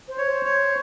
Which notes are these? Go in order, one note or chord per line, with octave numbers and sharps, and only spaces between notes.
C5
C#5
C5
C#5